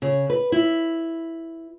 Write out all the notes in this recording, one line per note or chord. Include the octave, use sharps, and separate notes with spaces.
C#3
B4
E4